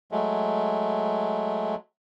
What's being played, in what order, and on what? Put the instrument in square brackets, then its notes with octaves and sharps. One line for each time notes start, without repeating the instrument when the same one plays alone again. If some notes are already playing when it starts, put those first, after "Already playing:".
[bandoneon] F#3 G#3 A3